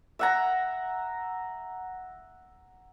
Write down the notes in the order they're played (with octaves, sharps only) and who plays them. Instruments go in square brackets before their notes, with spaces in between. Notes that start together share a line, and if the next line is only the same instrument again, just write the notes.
[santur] E5 F#5 A#5